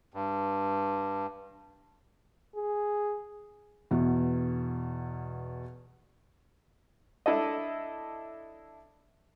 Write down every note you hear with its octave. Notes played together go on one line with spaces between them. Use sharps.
G2
G#4
E2 B2
D4 E4 A4 D#5